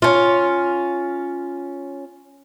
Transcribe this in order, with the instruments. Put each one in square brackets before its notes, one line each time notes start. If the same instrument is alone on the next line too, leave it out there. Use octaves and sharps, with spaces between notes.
[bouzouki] C#4 F4